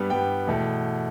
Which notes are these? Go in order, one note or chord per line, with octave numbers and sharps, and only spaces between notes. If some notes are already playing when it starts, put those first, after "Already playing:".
Already playing: G2 G3 B3
G2 G3 B3 G5
E2 B2 A3